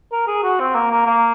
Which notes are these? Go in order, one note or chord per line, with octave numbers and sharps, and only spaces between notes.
A#4
G#4
F#4
C4
A#3
A#3
A#3